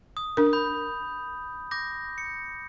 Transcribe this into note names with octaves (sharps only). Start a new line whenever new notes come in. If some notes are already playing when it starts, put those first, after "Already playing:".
D#6
D4 A#4
B5 G6
D6 G6 A#6
C#7